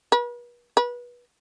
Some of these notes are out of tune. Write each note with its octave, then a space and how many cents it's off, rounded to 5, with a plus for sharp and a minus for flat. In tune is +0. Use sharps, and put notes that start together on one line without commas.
B4 -40
B4 -25